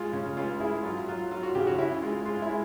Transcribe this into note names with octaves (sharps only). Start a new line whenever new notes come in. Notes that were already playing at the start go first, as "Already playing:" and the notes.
Already playing: G#3 F4
C#3
C#2 F4
G#3 E4
F#3 F4
F#3 F4
F#3 F4
F#4
C#3 G4
F#4
C#4 E4
G#3 F4
G#3 F4
E4
G#3